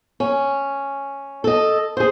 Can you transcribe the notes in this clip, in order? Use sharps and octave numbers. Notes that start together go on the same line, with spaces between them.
C#4
A4 D#5
G#4 C5